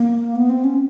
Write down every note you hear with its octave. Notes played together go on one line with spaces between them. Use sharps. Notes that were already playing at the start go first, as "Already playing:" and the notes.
Already playing: A#3
B3
C4
C#4